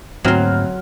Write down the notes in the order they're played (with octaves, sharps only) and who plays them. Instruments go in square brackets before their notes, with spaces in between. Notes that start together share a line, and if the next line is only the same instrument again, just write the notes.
[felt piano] D2 C4 F6 [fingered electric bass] G#2 A#3 [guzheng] F#3 C6